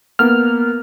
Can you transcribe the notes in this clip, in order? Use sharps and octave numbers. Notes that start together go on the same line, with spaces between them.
A#3 B3 F6